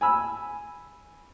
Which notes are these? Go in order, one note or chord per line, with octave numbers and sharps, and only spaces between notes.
G#5 B5 E6